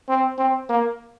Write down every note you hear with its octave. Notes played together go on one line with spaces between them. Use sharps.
C4
C4
A#3